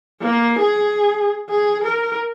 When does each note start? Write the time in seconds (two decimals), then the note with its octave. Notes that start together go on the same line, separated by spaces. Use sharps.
0.21 A#3
0.59 G#4
1.49 G#4
1.84 A#4